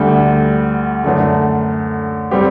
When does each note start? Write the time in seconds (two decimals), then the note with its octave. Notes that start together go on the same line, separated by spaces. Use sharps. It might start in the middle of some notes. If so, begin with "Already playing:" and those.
Already playing: D2 D3 G3
1.04 F#2 D3 A3
2.31 G3 C4 G4